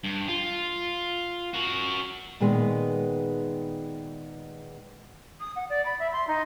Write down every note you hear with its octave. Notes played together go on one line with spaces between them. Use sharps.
G2
F4
F#4 A#4
A#2 D#3 G#3 B3 B4
D#6
F#5
D5
B5
E5
C6
D#4